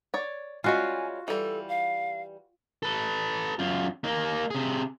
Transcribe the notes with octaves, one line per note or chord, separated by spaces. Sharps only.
C#5 D5
G3 G#3 C#4 F4 F#4 G#5
E3 G3 A4
F5
A4 B4
F#2 F4
A#3 D#4
C3 G#4